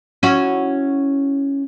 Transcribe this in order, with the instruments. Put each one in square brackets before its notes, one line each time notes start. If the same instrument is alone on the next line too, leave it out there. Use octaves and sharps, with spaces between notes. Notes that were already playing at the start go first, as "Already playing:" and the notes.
[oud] C#4 E4 F#4